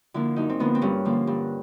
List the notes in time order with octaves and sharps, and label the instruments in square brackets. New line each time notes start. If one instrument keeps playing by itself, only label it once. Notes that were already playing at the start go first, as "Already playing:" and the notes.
[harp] D3 F3 A#3 E4
F#2 D#4
C4
D3 F3 A#3 B3
C4
G2 C#4
D3 F3 A#3
G2